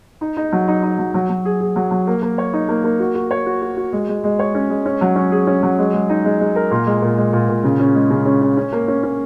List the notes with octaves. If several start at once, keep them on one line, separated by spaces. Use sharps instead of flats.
D#4
D#4
F#3
D#4
D#4
F#3
F#3
F#3
G#4
G#4
F#3
F#3
A#3
A#3
C#5
D#4
A#3
A#3
F#4
F#4
C#5
F#4
F#4
F#4
G#3
G#3
G#3
C#5
C#4
G#3
C#4
F#3
C#4
G#4
C#4
F#3
G#3
G#3
D#4
G#3
G#3
A#4
A#2
G#3
A#2
G#3
A#2
A#2
C#3
C#4
G#3
C#3
C#4
C#4
C#4
A#3
C#4
C#4